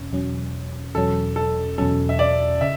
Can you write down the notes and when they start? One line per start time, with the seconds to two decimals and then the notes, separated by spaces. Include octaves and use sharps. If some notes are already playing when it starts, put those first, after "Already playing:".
Already playing: E2 B2 C#4
0.12 E2 B2 F#3 C#4
0.95 E2 B2 F#3 C#4 A4
1.36 A4
1.78 E2 B2 F#3 C#4 A4
2.09 E5
2.19 D5
2.61 C#3 E5